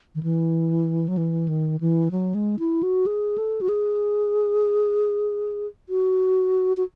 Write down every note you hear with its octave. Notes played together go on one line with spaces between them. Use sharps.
D#3
E3
F#3
E3
D#3
E3
F#3
G#3
E4
F#4
G#4
A4
F#4
G#4
F#4
F#4